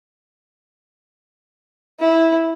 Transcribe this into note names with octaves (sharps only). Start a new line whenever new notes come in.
E4